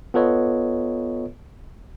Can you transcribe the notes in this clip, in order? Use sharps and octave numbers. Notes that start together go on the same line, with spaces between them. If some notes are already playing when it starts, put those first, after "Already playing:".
B3 F4 A4 B4 C#5 D#5